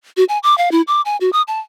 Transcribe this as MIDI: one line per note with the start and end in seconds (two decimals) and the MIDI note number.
0.17 0.24 66
0.29 0.39 80
0.43 0.57 86
0.58 0.69 77
0.72 0.82 64
0.87 1.01 86
1.05 1.17 80
1.21 1.30 66
1.33 1.42 87
1.48 1.60 81